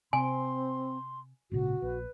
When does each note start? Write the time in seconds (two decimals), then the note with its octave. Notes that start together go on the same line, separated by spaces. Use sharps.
0.13 C3 C4 G#5 C6
1.52 G#1 A#2 C#3 F#4
1.82 A#1 B4